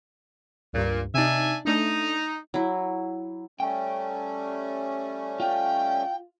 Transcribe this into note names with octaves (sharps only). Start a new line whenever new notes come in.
C#2 G2 A#2
C3 D4 D#4 E5 G#5
A3 D4 D#4
F#3 E4
G3 A3 C#4 G5
F4 G5